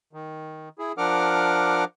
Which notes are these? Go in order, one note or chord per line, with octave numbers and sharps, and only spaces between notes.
D#3
E4 G#4
F3 D4 A#4 F#5 D6 F6